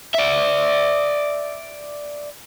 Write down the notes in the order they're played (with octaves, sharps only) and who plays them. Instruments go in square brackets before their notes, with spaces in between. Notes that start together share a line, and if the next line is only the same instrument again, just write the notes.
[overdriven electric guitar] D5 E5